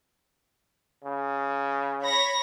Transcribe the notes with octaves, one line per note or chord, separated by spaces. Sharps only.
C#3
C#5 B5 A#6